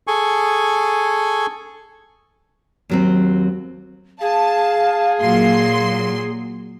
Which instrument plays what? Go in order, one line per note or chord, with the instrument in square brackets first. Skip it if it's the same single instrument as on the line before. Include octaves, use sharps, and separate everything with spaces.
[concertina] G#4 A4 G#5 C#6
[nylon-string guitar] D#2 F#3 C4
[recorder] G#4 [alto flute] F5 [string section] A5
[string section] A#2 F#3 C6